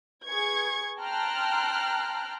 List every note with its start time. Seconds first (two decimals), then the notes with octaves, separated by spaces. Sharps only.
0.25 G#4 B4 C#6 G#6
0.99 G5 A5 A#5 C6 F6 F#6